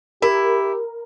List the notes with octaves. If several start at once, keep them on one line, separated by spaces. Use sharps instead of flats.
E4 G4 A#4